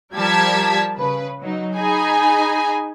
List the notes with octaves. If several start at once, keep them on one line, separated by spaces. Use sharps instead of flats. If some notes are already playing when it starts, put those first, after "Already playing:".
F3 G3 A#4 A5 G#6 B6
C#3 B4
F#3 D#4
D#4 G#4 G#5 B5